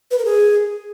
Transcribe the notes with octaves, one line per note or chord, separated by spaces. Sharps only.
B4
A#4
G#4